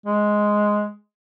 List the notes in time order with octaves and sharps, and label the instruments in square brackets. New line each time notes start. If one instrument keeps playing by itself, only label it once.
[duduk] G#3